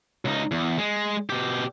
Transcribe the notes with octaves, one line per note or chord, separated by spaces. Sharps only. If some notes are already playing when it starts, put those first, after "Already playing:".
C#2 D#4
E2
G#3
B2 G4